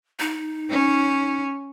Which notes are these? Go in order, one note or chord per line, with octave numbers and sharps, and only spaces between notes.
D#4
C#4